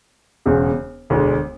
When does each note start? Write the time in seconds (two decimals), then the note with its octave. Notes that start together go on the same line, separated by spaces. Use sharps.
0.46 E1 E2 C#3 G#3
1.10 E1 D2 D3 G#3